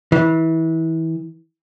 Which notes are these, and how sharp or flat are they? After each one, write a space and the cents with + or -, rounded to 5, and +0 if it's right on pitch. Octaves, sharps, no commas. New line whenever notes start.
E3 -25